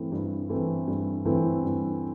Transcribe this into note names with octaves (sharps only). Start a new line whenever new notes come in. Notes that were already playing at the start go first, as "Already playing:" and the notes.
Already playing: G2 E3 A3 C4 E4
G2
E3 A3 C4 E4
G2
E3 A3 C4 E4
G2